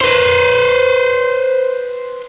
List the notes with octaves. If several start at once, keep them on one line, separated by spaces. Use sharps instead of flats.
B4 C5